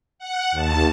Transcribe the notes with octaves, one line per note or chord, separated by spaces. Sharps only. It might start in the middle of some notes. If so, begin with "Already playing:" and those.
F#5
D#2 A5